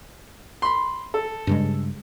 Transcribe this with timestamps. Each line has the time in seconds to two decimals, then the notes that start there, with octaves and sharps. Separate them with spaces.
0.62 B5 C6
1.14 A4
1.47 G2 C#3 G#3